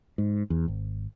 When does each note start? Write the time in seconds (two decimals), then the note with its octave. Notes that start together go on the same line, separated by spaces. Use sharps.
0.18 G#2
0.50 E2
0.68 G#1